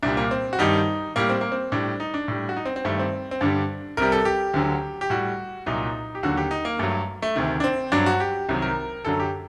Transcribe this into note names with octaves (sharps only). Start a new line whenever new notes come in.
C2 A#2 G3 D4
A#3
C4
F#4
G2 D#3 G3 D#4
A2 G3 A#3
C4
A#3
C4
A2 G3 D4
D#4
D4
A2 G3
F#4
D#4
C4
C4
G2 D#3 G3 A3
C4
C4
G2 D3 G3 D4
C2 C3 G3 A#4
A4
G4
D2 D3 F#3
G4
A2 G3 F#4
C2 A#2 F#3 D#4
G4
D#2 D3 F#3 F#4
G4
D#4
A#3
G2 F#3 A3
A3
D2 C3 D#3
D4
C4
G2 F#3 D4
F#4
G4
C2 C3 D#3 F#3
A#4
F#2 D3 F#3 A4
G4